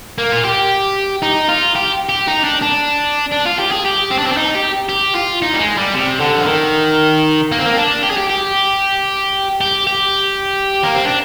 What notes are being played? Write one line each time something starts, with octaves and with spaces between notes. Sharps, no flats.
A#3
F4
G4
D#4
F4
G4
G4
D#4
D4
D4
D4
F4
G4
G#4
G4
C4
D4
C4
D4
D#4
G4
G4
F4
D#4
G3
G#3
G3
C3
D3
F3
D#3
A#3
C4
A#3
D4
G4
G#4
G4
G4
G4
G4
A#3
C4
D4